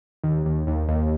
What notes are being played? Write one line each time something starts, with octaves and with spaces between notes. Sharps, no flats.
D#2
D#2
D#2
D#2